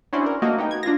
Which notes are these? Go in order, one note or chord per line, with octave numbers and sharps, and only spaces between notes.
C#4 D4 E4 F#4 C5 D5
A#4
A3 A#3 F#4 A#4 D#5
B3 D#4 G5
G#6
D4 F4 F5 A#6